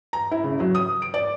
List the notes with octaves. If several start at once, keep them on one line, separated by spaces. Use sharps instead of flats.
A#5
E4
C#3
F#3
D#6
D7
D5